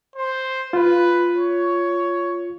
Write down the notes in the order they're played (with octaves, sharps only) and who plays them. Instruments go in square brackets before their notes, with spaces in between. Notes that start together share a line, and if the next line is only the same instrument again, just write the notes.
[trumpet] C5
[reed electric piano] F4 [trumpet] B4
[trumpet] C#5